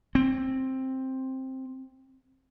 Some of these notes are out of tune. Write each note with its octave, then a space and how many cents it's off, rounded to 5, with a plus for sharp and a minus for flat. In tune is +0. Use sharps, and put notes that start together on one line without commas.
C4 +10